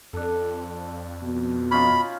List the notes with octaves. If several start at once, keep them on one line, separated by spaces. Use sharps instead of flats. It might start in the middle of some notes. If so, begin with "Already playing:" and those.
F2 D4 A4
B2
C#4 D#4 F4 B5